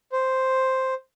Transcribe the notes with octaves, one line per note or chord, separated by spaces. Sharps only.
C5